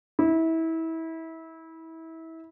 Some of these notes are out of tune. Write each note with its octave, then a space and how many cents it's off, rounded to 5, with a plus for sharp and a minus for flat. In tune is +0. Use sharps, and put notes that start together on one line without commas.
E4 -25